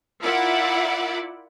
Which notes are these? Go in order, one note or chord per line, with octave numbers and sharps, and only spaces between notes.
E4 F4 A#4 D5 E5 F#5